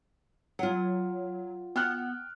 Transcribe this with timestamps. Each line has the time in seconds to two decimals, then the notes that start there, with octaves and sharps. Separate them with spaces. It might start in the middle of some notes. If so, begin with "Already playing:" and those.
0.59 F#3 F4 F#5
1.76 B3 G5 F6 F#6